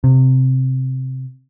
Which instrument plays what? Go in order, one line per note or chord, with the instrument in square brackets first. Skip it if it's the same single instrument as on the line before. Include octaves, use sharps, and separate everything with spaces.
[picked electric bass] C3